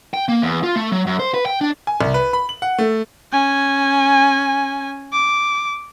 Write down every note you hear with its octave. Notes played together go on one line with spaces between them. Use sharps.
G5
A#3
E2
F4
A3
F#3
F#2
C5
B4
G5
D4
G#5
C2
B4
B5
F#7
F#5
A3
C#4 G#5
D6